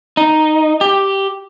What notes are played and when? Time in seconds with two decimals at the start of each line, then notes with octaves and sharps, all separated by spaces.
0.17 D#4
0.81 G4